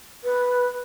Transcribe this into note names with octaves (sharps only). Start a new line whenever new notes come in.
B4